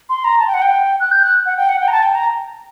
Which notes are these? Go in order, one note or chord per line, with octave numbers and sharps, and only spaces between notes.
C6
A#5
A5
G5
F#5
G5
F#6
G6
F#6
F#5
G5
F#5
G5
A#5
A5
G5
A#5